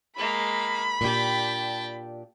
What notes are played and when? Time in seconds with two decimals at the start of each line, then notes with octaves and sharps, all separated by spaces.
0.17 G#3 A#3 B5
1.01 A#2 D4 G4 G5 A5